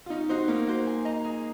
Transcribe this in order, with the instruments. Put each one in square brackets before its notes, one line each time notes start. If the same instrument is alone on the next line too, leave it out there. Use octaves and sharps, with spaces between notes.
[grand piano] F4
[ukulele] C#4 [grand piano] D#4
[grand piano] D#4 [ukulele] F#4 C5
[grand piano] A#3 [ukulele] C#4
[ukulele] F#4 C5
G#4
D#5 A#5
G#4